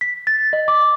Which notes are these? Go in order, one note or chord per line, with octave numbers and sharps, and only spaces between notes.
B6
A6
D#5
D6